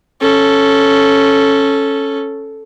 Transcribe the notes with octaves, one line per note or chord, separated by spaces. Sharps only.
C#4 A4